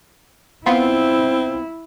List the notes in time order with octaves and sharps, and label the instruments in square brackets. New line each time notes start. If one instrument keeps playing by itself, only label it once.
[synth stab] B3 F4 [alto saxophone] C4 [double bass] E4